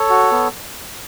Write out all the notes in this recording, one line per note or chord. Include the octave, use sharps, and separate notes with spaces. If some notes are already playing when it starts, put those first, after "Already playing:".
Already playing: A4 C#5
F#4
B3